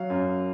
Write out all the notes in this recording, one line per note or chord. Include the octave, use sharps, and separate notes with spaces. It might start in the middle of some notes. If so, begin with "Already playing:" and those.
Already playing: F#3 F5
F#2